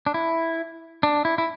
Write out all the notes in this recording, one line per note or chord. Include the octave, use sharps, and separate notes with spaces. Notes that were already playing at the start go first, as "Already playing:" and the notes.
D4
E4
D4
E4
E4